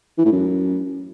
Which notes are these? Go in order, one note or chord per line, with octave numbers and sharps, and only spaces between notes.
E3
A2
F#2